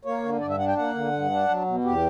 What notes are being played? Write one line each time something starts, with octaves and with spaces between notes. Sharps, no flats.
A#3 C#5
D3
G2 D5
E5
D4 F#5
G5
A#3 F#5
D3
G2
D4
F#3
B2
E2 G4